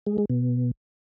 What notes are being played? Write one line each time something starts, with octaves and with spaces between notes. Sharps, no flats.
G#3
G#3
B2